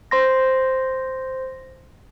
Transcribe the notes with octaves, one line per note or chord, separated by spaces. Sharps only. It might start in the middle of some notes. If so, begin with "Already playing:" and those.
C5 C6 A#6